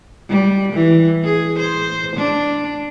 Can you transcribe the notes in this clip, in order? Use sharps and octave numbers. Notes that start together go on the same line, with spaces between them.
G3
E3
G#4
C5
D4